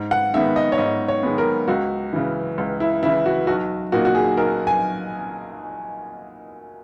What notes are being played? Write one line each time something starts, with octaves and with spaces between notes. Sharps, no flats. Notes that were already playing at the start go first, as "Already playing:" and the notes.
Already playing: G#2
F#5
D#3 G#3 B3 E5
D#5
C#5
G#2 D#5
C#5
D#3 G#3 B3
A#4
C#2 F#4
C#3 E3
C#2
E4
C#3 E3 E4
F#4
B1 F#4
A#2 A#3 D#4 F#4
F#4
G#4
B1 A#4
G#5